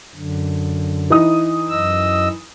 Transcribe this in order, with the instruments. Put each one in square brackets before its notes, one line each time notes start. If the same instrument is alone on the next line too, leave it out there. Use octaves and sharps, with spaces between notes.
[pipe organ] F#2 D3
[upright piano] E3 D#4 D#6
[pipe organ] F#2 D#5 E6